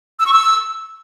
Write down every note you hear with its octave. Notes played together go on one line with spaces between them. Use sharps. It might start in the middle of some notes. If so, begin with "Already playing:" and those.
E6
C#6
E6